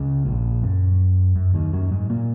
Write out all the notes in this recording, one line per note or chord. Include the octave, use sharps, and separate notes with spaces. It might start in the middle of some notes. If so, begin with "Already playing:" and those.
Already playing: C#2 C#3
A#1 A#2
F#2
F#2
D#2 D#3
F#2 F#3
G#2 G#3
A#2 A#3